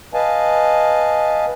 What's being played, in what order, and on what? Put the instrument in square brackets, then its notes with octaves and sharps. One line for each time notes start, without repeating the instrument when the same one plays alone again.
[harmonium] B4 D#5 F5 G#5 A5